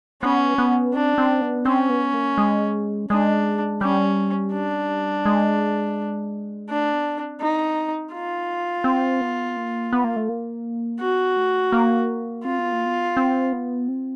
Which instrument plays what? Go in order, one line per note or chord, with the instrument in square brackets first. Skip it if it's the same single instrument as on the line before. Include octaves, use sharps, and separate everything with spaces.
[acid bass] B3 [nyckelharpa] C#4
[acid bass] B3
[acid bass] C4 [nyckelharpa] D4
[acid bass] C4
B3
[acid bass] C4 [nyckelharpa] C#4
[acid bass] B3
A#3
G#3
[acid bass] G#3 [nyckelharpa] D4
[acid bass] G3 [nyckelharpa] C#4
[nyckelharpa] D4
[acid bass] G#3
[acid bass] A3 [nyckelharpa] D4
[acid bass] B3
C4
[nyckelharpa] D#4
F4
[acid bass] C4
B3
A#3
B3
A#3
A3
A#3
[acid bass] B3 [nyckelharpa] F#4
[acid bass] A3
A#3
[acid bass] C4 [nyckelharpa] F4
[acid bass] B3
A#3
B3
C4
B3
C4